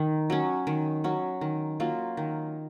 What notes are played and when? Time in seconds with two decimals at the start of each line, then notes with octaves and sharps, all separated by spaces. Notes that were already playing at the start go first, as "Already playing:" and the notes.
Already playing: D#3
0.30 F#3 C#4
0.67 D#3
1.04 F#3 C#4
1.41 D#3
1.80 F#3 A#3 F4
2.17 D#3